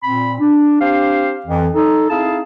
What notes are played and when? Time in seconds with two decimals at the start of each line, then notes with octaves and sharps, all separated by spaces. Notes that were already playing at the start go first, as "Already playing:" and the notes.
0.03 A#2 C4 B5
0.39 D4
0.80 C4 D4 G4 C5 F5
1.45 F2 E3
1.75 D#4 A4
2.09 C4 D#4 E4 G#4 F5 A5